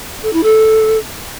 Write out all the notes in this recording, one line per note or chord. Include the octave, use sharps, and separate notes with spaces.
A4
E4
A4